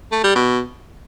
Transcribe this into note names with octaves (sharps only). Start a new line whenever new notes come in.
A3
G3
B2